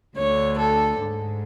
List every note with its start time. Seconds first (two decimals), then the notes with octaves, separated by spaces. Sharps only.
0.17 D2 D3 C#5
0.59 A4
1.00 G#2